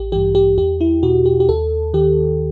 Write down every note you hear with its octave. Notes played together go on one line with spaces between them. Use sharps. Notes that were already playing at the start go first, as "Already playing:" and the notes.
Already playing: A1 G4
G2 E3 G4
G4
E2 G4
E4
B2 F#4
G4
G4
D#2 A4
D#3 G4